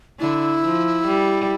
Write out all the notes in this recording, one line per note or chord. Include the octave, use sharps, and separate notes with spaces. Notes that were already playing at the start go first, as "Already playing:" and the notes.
D3 E4
F3
G3